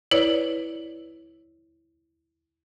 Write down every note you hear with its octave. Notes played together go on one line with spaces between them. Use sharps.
E4 B4 C#5 D5